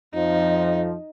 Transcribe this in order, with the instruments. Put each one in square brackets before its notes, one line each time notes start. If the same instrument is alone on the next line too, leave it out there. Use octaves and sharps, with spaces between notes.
[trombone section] F2 F3 [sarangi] D#4